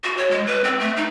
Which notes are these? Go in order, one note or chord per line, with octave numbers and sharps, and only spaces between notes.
F#4
C#5
G#3
B4
C4
A3
D#4